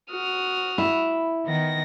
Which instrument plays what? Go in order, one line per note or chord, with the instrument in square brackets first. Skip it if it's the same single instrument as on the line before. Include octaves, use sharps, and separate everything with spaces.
[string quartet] F#4 D#6 F6
[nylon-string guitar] E4
[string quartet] D#3 B3 A#6